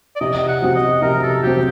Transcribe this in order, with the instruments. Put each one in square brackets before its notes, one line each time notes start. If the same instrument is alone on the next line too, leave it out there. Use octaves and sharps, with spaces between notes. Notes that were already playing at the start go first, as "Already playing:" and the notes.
[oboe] D5
[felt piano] C3 [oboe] D#5
[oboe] D#5
F#5
[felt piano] F#3 C4
[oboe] D#5
[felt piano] C3 [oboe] A#4
[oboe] A4
[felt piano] F#3 C4 [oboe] G4